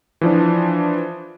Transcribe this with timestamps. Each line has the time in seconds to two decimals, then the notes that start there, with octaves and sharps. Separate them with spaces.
0.21 E3 F3 D4